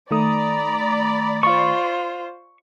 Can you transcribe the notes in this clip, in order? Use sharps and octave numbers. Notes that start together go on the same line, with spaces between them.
D#3 A3 D5 A#5 B5 D#6
F4 C5 C#6